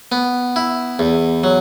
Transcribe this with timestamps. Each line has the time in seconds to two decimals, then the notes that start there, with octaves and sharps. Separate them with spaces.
0.12 B3
0.56 E4
0.99 E2
1.44 F#3